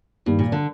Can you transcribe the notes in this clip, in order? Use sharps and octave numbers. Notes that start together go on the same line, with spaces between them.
G2 D#3 G3 A#3
A#2
D3